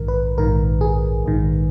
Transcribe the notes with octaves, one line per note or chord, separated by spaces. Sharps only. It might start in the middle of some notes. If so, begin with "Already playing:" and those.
Already playing: A#1 G#2 D#3 A#4
B4
A#1 G#2 D#3 A#4
G#4
A#1 G#2 D#3